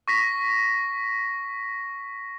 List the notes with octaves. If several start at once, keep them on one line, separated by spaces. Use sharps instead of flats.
C#6 A#6 B6